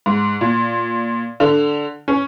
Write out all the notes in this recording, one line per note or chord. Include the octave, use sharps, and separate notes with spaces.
G#2
A#2
D3
C#4